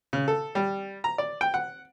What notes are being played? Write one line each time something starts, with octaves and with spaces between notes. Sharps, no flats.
C#3
A4
G3
A#5
D5
G5
F#5